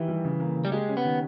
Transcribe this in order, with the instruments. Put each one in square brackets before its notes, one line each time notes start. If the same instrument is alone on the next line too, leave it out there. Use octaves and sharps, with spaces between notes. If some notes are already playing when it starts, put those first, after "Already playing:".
Already playing: [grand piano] D#3 E4 G4 [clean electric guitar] E3
[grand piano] G3
C#3
A#3
C#3
[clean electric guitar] G3
[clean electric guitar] G#3 [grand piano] G4
[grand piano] C#4
[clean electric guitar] B3
[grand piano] D#3